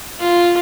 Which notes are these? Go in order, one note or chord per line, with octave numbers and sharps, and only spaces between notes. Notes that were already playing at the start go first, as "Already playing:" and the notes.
F4